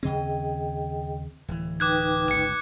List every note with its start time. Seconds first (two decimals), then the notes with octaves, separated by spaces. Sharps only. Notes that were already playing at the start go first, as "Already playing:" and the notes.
0.03 D#2 C#3 C4 G#4 D#5 G5
1.48 D1 E3
1.80 D#4 B4 G5 D6 F#6 G#6
2.31 G1 C#2 C#7